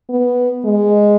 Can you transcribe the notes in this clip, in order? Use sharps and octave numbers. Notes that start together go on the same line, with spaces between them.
B3
G#3